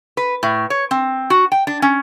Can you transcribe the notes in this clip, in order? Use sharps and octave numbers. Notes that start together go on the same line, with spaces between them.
B4
A2
C#5
C4
F#4
G5
D4
C#4